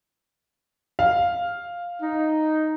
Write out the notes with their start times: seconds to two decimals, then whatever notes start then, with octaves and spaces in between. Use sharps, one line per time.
0.99 F5
2.02 D#4